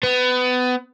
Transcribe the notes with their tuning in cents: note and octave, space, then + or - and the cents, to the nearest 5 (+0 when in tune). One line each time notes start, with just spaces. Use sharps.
B3 +25